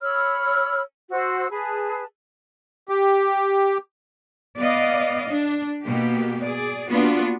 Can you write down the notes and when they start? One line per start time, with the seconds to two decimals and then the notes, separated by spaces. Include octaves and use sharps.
0.01 C#5 B5 E6 F6
1.11 F#4 C5 E6
1.50 G#4 B4 A5
2.89 G4
4.58 B3 D5 D#5 F5
5.29 D4
5.85 B2 A#3 G4
6.43 G#4 D5
6.91 A#3 B3 D4 F4 F#4